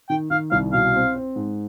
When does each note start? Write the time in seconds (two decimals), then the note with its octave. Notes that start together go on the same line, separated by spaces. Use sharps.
0.09 D#3 G5
0.30 D#3 F5
0.51 C2 F5
0.73 B2 F5
0.93 C4
1.15 C4
1.36 G#2